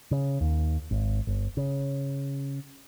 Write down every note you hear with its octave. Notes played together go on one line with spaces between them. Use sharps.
C#3
D#2
G#1
G1
C#3